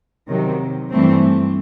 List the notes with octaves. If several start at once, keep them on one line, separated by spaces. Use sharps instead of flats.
C3 D#3 F#3
G2 E3 A3 C4